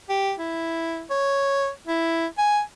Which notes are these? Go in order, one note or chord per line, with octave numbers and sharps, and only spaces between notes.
G4
E4
C#5
E4
G#5